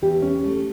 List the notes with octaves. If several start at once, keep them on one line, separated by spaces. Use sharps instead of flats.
E2 G4
C#4
A3